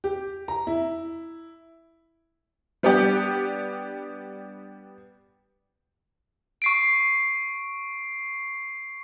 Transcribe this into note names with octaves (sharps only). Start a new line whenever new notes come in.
G4
A#5
E4
G3 B3 D4 G4
C#6 C7 D7